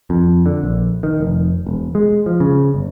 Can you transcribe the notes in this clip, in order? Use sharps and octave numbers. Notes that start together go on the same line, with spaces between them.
F2
D3
A#1
D#3
F1
E1
G#3
F3
C#3
G1